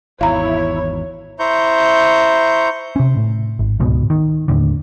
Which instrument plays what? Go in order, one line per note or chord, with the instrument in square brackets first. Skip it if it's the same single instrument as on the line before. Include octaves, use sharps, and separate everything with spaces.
[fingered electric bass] G#1 E2 [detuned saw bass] E4 [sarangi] C#5 [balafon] F5 A#5
[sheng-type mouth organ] E4 C5 A#5 C#6 G6
[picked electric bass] C3 C#4
A2
G#1
D1 C#2 G#2 B2
D#3
D#2 A2 D3